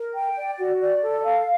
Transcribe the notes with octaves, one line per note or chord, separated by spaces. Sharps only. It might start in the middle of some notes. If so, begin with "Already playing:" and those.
Already playing: A#4
G5
D5
F#4
D5
A4
F5